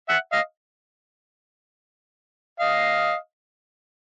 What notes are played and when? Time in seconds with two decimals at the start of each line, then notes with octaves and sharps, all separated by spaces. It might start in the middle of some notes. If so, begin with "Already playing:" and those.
0.09 E5 F#5
0.32 D#5 F5
2.60 D#5 F5